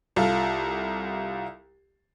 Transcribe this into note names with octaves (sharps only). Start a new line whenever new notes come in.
C2 F4 A4